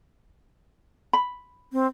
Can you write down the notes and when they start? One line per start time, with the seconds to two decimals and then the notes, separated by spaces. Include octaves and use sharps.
1.13 B5
1.73 C4